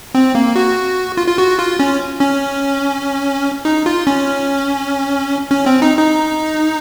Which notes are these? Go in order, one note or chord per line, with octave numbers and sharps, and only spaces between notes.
C4
A#3
F#4
F4
F4
F#4
F4
C#4
C#4
D#4
F4
C#4
C#4
C4
D#4
D#4